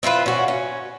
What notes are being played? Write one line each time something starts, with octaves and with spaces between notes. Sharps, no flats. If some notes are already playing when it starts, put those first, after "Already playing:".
C4 E4 F4 B4
C#4 F#4
C#4